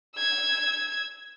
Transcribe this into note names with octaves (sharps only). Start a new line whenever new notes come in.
E6 G#6